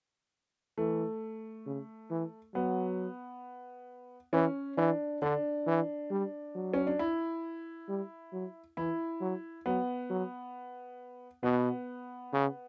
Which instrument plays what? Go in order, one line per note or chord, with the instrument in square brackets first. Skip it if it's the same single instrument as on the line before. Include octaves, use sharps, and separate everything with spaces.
[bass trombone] E3 [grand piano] A3
[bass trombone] C#3
E3
[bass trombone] F#3 [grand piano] B3
[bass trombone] E3 [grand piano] C#4
[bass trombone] E3 [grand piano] D4
[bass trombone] D3 [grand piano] D4
[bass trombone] E3
G3
F#3
[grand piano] C#4
D4
E4
[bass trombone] G3
F#3
[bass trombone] E3 [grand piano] E4
[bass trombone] F#3
[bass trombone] F#3 [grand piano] B3
[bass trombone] F#3
[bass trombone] B2 [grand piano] B3
[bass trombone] C#3